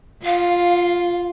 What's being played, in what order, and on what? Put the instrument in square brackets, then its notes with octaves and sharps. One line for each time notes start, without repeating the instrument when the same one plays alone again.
[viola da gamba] F4 [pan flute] F5